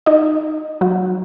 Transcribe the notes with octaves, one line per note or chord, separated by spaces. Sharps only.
D#4 D#5
F#3 F#4